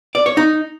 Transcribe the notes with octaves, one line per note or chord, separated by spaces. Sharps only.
D5
C#5
D#4